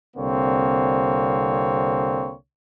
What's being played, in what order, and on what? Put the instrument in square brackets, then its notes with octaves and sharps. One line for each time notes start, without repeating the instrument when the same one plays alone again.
[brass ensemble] C2 D3 A#3 C4 C#5